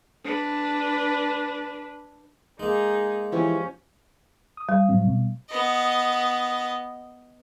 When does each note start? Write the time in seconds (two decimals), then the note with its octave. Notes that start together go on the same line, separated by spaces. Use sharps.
0.24 D4 B4
2.60 G#3 A#3 D#4 G#4
3.32 E3 F3 C#4 G4 C#6
4.57 D#6
4.69 G3
4.89 A2 F#3 C4
5.06 B2
5.50 B3 D#5